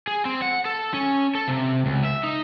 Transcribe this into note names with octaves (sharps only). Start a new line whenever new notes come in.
G#4
C4
F#5
A4
C#4
A4
C3
C#2
E5
D#4